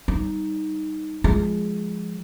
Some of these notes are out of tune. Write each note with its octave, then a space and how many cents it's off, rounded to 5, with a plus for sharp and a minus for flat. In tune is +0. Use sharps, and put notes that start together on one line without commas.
G3 +0 D#4 +0
F3 +0 G#3 +0